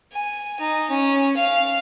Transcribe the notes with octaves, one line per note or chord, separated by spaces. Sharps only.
G#5
D#4
C#4
F5